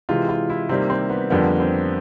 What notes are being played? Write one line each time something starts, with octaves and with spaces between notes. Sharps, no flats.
C3 E3 G#3 F4
F4
E4
C3 D#3 G3 A#3 C4
C4
B3
F2 D3 G3 A#3 B3
C4